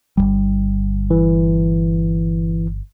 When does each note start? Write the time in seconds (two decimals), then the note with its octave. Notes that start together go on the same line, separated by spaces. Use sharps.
0.17 G1 C#2 G3
1.10 E3